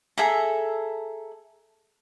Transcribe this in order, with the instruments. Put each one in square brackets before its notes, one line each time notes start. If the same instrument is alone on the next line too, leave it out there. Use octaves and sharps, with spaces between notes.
[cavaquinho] G#4 A4 E5 A#5